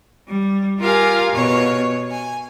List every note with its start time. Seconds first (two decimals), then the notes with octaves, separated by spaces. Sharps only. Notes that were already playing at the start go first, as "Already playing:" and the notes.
0.28 G3
0.80 F4 G4 A#4 F5 G#5
1.32 B2 C#5
2.10 G#5